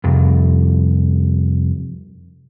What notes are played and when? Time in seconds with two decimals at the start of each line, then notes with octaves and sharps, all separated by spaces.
0.04 C2 F2